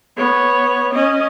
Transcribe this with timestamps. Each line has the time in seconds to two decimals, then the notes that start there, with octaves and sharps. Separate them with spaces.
0.17 B3 C#5
0.94 C#4 D#5